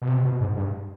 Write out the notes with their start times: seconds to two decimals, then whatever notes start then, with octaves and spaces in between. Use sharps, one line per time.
0.02 B2
0.08 C3
0.25 B2
0.40 G#2
0.57 G2